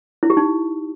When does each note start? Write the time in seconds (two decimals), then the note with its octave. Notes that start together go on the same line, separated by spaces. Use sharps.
0.23 E4
0.30 G4
0.37 D#4